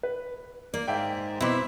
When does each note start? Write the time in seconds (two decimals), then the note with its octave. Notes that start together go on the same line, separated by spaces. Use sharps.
0.03 B4
0.74 A#3 D5
0.88 G#2 E5 F5 G5
1.41 B2 C4 E4 E5 C6 D6